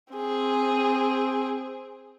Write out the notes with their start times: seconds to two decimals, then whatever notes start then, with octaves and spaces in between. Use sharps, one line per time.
0.13 C4 G#4